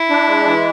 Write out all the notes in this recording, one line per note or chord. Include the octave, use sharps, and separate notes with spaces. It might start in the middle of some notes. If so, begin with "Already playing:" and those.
Already playing: E4
D4
G#3
E3